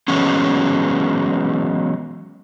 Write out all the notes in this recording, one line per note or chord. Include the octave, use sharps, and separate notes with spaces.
E3 F#3 G#3 B3 C#4